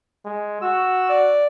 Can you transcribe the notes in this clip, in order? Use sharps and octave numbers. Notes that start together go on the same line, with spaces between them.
G#3
F#4 E6
D5